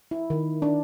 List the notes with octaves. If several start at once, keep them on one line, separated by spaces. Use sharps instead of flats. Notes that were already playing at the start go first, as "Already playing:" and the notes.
E4
D#3
D4